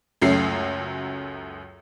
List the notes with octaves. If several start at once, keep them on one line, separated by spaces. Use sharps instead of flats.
C#2 F#2 F#3 A3 C7